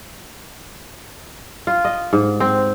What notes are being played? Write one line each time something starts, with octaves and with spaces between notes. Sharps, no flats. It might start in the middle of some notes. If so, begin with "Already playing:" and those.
F4
D#5
G#2
C4